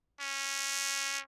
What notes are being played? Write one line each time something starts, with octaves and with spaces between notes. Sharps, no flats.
C#4